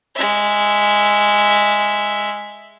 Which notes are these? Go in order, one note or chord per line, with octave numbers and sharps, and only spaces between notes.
G#3 E5